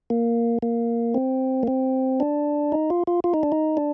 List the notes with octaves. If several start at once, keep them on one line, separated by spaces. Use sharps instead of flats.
A#3
A#3
C4
A#3
C4
D4
D#4
F4
F4
F4
D#4
D4
D#4
D4